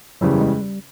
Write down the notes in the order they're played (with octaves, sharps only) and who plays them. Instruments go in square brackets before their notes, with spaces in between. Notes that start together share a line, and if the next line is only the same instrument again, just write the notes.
[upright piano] F#1 E2 C#3 E3 G3 [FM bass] F#3
[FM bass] G#3
G3